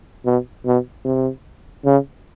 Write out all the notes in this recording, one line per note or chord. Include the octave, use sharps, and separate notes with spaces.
B2
B2
C3
C#3